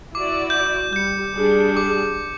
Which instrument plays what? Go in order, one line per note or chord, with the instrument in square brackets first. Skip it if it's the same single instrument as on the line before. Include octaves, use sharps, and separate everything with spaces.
[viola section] E4 F#4 D5 [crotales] D6
[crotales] G6
[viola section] G3 [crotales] G6 C#7
[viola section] G3 D4 G#4
[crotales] D6